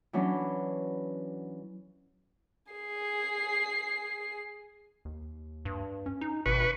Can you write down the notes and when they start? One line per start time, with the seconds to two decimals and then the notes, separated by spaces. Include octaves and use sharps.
0.13 E3 F#3 B3 C#4 D4
2.72 G#4 C7
5.05 D#2
5.65 G2
6.06 C#4
6.21 D#4
6.46 G#1 B2 B4 C#6